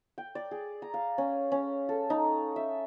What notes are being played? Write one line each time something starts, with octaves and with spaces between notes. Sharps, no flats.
G5
D5
G#4
A#5
F5
C#4
C#4
A4
D#4
E5